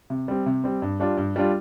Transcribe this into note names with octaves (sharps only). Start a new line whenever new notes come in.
C3
G3 C4
C3
G3 C4
G2
G3 D4 F4
G2
G3 D4 F4